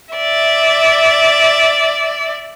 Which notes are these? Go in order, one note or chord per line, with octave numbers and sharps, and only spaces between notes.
D5 E5